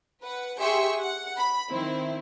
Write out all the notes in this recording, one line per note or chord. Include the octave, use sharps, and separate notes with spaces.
B4 F#5
G4 G#4 E5 G5 C6 C#6
F#5
B5
D#3 C4 E4